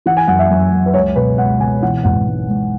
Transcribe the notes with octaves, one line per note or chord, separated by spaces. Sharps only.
E3 F#5
G#5
F#2 F#5
E5
F#2
F#2
B4
C#2 C#5
B2 B4
C#2 F#5
B2 G#5
E3 F#5
G#1 F#5
G#2
G#2